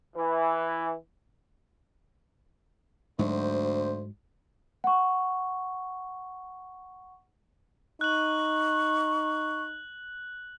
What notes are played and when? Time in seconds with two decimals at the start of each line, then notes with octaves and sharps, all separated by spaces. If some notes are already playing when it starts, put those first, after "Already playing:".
0.16 E3
3.19 D2 G#2 F#3 C5
4.84 F#5 C#6
8.01 D#4 C#6 F#6 F#7